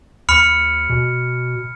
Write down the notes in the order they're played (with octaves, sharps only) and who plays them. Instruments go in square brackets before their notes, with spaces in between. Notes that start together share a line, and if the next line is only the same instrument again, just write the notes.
[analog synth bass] D#2 [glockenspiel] B5 F6 C#7
[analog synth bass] B2